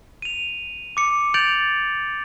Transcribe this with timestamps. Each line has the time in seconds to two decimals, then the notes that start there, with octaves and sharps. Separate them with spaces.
0.22 D#7 F7
0.97 D6 C#7
1.34 G6 A6 D7 F7 F#7